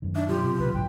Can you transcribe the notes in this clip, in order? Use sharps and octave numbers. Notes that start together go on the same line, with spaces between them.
F#2 D#3
D4 D#4 E5
B2 F#3 F4 G4
C3
C2 C3 D#3 B4
B1 G#2 D3 G5